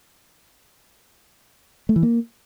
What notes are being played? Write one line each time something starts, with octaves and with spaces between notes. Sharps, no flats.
A3
E3
A#3